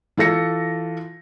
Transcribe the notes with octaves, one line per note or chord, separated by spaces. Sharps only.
E3 F4 A4 A#6 C#7